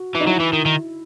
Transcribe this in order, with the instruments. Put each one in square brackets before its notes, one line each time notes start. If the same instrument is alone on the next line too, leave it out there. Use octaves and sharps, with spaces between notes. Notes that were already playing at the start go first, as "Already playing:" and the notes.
Already playing: [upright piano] F#4
[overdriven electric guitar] E3
[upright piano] D#4
[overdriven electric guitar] F#3 [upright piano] E4
[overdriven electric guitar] E3
D#3
D#3